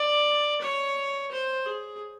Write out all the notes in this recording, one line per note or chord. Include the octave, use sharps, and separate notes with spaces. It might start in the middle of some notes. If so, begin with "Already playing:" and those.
Already playing: D5
C#5
C5
G#4